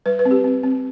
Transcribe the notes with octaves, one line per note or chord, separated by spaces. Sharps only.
G3 B4
B4
C4
G4
C4
C4